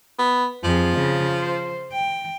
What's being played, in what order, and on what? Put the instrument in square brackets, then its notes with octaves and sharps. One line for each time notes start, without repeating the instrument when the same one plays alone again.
[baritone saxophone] B3
[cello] F2 G#4 [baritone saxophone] F3
[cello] C#3
C5
G5